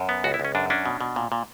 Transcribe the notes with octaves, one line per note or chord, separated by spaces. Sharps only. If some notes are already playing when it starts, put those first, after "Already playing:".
Already playing: F#2
B3
C#2 F#4
E4
C#2
C#4
F#2 D4
C#4 D4
B2
B2
A#2
A#2